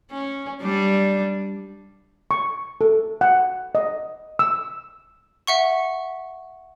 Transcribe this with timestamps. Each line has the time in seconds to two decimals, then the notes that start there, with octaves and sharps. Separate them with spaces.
0.12 C#4
0.62 G3 D4
2.31 C#6
2.81 A4
3.21 F#5
3.75 D#5
4.39 E6
5.47 E5 F#5 C#6